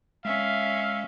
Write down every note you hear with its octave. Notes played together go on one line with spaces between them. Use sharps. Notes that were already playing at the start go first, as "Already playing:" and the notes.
G#3 C#4 E5 F5